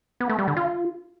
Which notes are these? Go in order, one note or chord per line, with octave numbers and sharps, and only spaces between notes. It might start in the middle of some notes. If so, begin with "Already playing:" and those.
B3
A3
G3
D3
F4